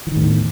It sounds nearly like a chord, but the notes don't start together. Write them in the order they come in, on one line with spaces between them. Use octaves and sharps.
E3 D#3 A2 E2